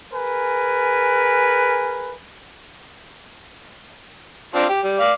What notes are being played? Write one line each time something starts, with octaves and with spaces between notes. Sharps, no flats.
G#4 A#4 B4 G#5
C4 D4 F4
G4
G3
D5 F5